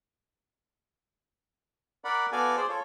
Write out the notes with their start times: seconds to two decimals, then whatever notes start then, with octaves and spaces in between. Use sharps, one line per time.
2.05 A#4 D5 F#5 B5
2.32 B3 F#4 A4 D5 F5 G#5
2.56 G#4 C5 D5
2.69 F4 A4 C#5